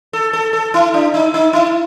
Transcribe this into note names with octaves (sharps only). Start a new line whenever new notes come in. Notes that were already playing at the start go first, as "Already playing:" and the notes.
A4
A4
A4
E4
D4
D#4
D#4
E4